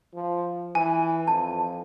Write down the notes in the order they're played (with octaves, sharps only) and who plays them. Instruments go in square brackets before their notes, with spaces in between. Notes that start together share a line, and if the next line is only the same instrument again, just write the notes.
[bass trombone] F3
[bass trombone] E3 [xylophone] G#5
[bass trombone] F2 [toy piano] A5